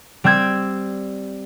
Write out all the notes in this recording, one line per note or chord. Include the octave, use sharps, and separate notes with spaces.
G3 C4 E6 G6 G#6